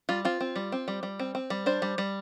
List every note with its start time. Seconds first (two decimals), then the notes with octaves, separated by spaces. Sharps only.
0.09 G3 F4
0.25 C4 F4
0.40 C4
0.56 G3
0.72 C4
0.88 G3
1.03 G3
1.19 C4
1.35 C4
1.50 G3
1.66 D4 C5
1.82 G3
1.98 G3